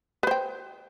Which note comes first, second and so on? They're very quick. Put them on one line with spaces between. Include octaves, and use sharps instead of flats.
B4 C5 G5